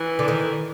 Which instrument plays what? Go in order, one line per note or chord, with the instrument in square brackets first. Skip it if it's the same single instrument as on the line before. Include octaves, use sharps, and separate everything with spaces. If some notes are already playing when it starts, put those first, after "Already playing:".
Already playing: [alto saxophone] E3
[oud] D3
D#3